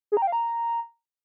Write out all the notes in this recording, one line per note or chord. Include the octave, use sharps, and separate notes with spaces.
G#4
A#5
G5
F5
A#5